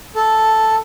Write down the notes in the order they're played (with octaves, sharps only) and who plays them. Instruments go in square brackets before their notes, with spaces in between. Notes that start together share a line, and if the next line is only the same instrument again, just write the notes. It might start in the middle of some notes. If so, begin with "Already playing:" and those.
[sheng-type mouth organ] A4